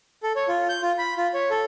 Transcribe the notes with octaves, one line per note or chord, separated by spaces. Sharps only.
A4
C#5
F4
G6
F4
B5
F4
C#5
A4